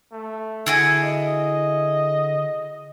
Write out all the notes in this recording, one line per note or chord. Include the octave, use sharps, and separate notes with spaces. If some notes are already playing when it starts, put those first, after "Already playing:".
A3
D3 E4 F#4 G#4
D#5